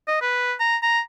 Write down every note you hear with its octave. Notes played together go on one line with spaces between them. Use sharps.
D#5
B4
A#5
A#5